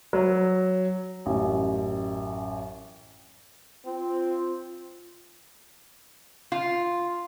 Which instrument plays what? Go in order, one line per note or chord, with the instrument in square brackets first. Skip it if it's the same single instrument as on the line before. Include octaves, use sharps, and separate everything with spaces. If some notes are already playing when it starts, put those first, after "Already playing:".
[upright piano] F#3
A1 F#2
[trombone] C4 [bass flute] F4
[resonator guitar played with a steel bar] F4